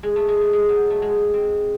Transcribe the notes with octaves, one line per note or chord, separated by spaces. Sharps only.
G#3
A3
G#3
A3
G#3
F#3
A3
G#3
C4